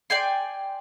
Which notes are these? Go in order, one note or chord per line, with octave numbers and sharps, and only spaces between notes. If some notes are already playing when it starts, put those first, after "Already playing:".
D5 G5 G#5 C6